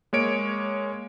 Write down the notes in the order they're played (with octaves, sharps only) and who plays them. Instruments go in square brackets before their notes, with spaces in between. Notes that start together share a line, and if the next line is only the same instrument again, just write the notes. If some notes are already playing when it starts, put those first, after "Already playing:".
[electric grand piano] G#3 A#3 C#5 D7